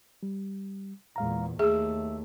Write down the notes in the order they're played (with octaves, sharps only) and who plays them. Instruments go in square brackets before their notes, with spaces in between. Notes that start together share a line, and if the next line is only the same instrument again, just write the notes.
[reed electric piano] G3
[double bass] E2 A#2 [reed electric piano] G#3 F5 A#5
[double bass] D#2 A3 [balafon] G#4 [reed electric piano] E5 E6